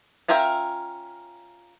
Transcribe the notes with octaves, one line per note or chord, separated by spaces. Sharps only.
C#4 F4 A#4 E5 G5